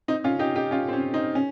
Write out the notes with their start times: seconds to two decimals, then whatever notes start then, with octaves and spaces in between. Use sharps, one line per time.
0.08 C4 D#4
0.24 C#4 F4
0.39 D#4 G4
0.56 D#4 G4
0.71 C#4 F4
0.88 C4
0.93 C#4
1.14 C4 D#4
1.35 C#4